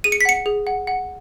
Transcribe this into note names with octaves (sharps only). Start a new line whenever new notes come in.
G#4 D#7
C#7
B6
F#5 C#7
G#4
F#5
F#5